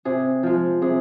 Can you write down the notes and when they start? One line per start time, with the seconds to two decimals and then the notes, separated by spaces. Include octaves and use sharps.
0.05 C3 G#4
0.43 F3 G#3
0.82 C3 G#4